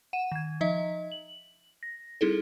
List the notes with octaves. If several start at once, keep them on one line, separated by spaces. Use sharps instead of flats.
F#5 D#7 E7
D#3 G#6
F3 D#4 D#5 E5 B6
F#7
A#6
G3 C4 D#4 E4 G#4 A4